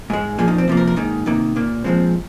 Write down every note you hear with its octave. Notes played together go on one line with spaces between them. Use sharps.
G#2 G#3
A#2 F3 A#3 G#4
D#4
C4
C3 F3 A#3
A#4
A#4
G#2 D#3 A#3 D#4
C3 D#3 A#3
A#2 A#3
A#2 F3 G#3 C4